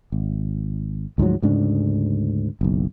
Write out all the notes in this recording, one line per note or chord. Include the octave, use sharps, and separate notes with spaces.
G#1
D2 G#2 F3 F#3
D2 G#2 C#3 D4
F#1 B1